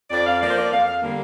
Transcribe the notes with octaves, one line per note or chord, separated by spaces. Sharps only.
F2 D5
F5
F3 A#3 D5
C5
D5
F2 F5
F5
D3 G3 A#3